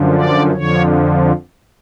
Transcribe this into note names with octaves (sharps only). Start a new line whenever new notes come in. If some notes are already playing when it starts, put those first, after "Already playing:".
Already playing: F#2 D3 F3
D5
F2 D3 F3 C#5